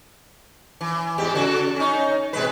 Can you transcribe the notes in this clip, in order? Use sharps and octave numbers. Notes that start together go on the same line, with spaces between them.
E3
E2 G#2 G4
C#3 F#4 A4
C#4 D#4
B2 G#3 B4